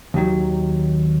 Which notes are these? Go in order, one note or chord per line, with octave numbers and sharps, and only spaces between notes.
D#2 D#3 F#3